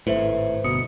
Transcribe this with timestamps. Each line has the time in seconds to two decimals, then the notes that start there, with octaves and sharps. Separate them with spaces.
0.07 G#1 A2 B4 C5 E5
0.64 G1 B2 D#6 C#7